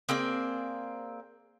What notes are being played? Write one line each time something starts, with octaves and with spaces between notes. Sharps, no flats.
A#3 C4 G#4 D5